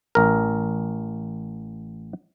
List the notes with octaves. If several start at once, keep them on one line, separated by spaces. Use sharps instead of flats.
A1 A#4